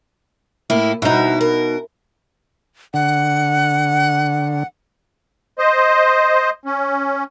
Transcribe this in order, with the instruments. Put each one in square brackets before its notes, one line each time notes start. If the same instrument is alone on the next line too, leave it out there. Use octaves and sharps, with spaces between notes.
[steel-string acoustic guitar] A2 A#3 E4
[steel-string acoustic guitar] D#2 E4 [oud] B2 D#4
[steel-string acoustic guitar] A#4
[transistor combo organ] D3 [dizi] F#5
[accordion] C5 D#5
C#4